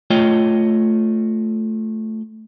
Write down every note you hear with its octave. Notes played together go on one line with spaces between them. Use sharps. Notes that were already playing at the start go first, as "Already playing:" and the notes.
A3 F4 C#5 D#5 G5